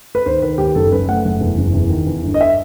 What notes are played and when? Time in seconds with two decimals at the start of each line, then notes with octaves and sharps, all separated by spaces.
0.15 B4
0.26 D#2 C5
0.42 D#3 B4
0.58 D#2 G4
0.75 F#1 A4
0.91 F#2 B4
1.08 A3 F#5
1.25 F#1
1.41 E2
1.58 F#1
1.74 E2
1.90 D#3
2.06 E2
2.23 G1
2.34 D#5
2.41 E5